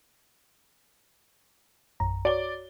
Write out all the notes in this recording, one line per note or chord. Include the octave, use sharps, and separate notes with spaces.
A#1 F#2 A#5
F#4 C#5 D5 G7